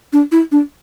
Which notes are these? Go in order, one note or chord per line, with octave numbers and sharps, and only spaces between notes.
D4
E4
D4